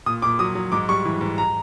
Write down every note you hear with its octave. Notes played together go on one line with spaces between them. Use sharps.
A#2 D#6
A#2 D6
F#3 D#6
F#3
G#2 D6
G3 C#6
E3
G#2
A#5